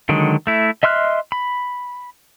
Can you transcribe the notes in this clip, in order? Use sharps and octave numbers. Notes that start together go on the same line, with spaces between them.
D3 D#3 F#3 G#3
A3 E4
D#5 E5 C6 F6 F#6
B5